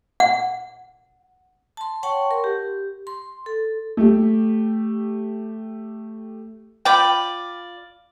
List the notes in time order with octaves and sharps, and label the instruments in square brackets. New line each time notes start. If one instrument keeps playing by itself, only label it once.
[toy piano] F#5
[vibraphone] A5 C6
C#5 F#5 G5 A5 C6 C#6
A#4
G4
C6
A4
[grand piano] A3 G4
[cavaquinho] F4 D5 B5 [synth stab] G5